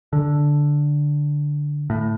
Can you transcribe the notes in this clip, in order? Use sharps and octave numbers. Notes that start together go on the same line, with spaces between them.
D3
A2